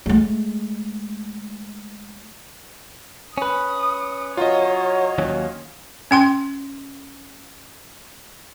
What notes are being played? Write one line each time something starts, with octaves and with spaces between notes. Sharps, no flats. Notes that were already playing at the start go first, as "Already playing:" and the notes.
G#3 A3
C#4 B4 D#6
F#3 F4 C#5 D#5
D#2 F#3 C#4
C#4 G5 C6